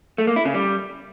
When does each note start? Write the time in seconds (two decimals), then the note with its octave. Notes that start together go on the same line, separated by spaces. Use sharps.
0.18 A3
0.27 A#3
0.36 E4
0.45 C#3
0.54 G3